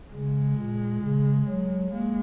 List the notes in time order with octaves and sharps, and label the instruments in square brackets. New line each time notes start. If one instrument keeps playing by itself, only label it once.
[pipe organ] C#3 [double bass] G#3
[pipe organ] A#2
C#3
F#3
[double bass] G#3 [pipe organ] A#3